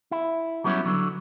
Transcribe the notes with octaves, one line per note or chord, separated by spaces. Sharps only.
E4
F#3 G3 B3 C#4 E4
D3 F#3